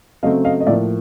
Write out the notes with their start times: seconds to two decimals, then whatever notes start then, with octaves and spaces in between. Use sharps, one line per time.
0.23 C#3 F#3 A3 C4 D#5 F5
0.45 D#5 F5
0.61 D#5
0.67 A2 F3 A#3 D5 E5